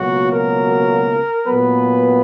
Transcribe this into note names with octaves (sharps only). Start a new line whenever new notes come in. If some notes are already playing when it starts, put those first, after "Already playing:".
Already playing: C#2 B2 F#3 A#3 F#4
A#4
A#2 F#3 B3 B4